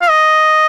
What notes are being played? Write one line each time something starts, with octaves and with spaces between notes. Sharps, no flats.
F5
D#5